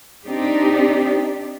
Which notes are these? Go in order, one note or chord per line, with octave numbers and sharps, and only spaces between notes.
C4 D4 D#4 G4